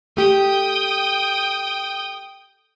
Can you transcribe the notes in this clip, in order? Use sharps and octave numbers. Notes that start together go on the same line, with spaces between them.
A3 G4 G5 D#6